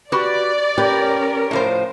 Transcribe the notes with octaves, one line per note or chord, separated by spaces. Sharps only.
F#4 G4 B4 D5
C#4 G4 A#4 B4
A2 F3 C5